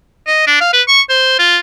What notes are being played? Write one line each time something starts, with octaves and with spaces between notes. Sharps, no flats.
D#5
D4
F5
B4
C#6
C5
F4